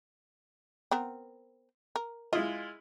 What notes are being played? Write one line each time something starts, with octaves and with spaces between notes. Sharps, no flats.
B3 C4 A#4
A#4
G#3 E4 F4 D#5